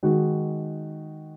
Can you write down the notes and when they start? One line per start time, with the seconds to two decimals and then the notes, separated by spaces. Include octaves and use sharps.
0.03 D#3 G#3 D#4 F#4